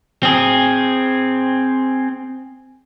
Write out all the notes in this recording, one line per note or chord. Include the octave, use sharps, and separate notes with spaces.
C4 G#4